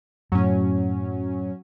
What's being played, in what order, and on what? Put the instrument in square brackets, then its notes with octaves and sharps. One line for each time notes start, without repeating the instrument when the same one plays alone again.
[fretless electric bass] F#2 A2 [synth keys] F#3 C#4